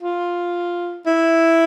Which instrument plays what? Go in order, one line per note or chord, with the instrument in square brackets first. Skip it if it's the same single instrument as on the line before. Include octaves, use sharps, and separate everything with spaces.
[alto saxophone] F4
E4